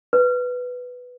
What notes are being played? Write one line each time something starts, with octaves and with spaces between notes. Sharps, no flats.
B4